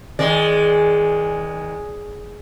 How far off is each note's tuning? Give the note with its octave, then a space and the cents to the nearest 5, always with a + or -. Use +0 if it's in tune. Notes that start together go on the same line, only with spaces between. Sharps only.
D#3 +45 G#3 +0 D5 -15